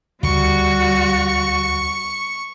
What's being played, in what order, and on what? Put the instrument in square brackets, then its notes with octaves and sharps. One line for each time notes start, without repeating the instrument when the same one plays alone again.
[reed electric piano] D2 [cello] G3 F#4 [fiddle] C#6